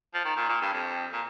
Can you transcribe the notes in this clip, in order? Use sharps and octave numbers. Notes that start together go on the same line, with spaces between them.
F3
D#3
A#2
A#2
G2
F2
A#2